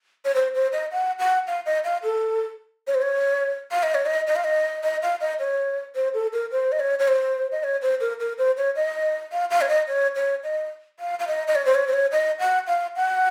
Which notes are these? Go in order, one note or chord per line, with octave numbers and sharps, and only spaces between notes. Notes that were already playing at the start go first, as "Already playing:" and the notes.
C#5
C5
C5
D#5
F#5
F#5
F5
D#5
F5
A4
C#5
C5
C#5
F5
D#5
C#5
D#5
D#5
F5
D#5
D#5
F5
D#5
C#5
C5
A4
A#4
C5
D#5
C#5
C#5
C5
D#5
C#5
C5
A#4
A#4
C5
C#5
D#5
F5
F5
C#5
D#5
C#5
C#5
D#5
F5
F5
D#5
D#5
C#5
C5
C#5
C5
C#5
D#5
F#5
F5
F#5